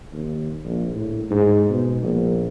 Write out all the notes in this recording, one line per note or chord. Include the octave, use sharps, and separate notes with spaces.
D#2
A#1
A2
G#2
B2
A#1